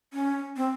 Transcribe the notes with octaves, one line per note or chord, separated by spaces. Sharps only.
C#4
C4